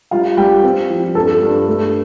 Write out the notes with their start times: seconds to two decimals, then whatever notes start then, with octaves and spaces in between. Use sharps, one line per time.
0.11 G3 F4 F5
0.37 G3 G4 G5
0.63 C4
0.90 F3
1.15 G2 A4 A5
1.42 G2
1.68 A3